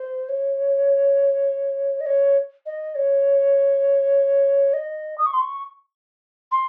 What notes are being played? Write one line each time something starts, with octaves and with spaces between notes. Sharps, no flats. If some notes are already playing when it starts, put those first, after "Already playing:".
Already playing: C5
C#5
D#5
C#5
D#5
C#5
D#5
D#6
C#6
C6
C#6
C6